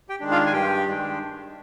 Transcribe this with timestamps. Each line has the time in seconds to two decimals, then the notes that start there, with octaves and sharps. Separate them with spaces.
0.09 G4 G5
0.20 D#3 G#3 D4
0.31 F4 F5
0.46 G#5
0.53 G2 G4 G5
0.86 D#3 G#3 D4